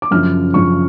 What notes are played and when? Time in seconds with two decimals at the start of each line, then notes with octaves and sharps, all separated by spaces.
0.02 D6
0.11 F#2 C#3 F3 F6
0.54 F#2 C#3 F3 C#6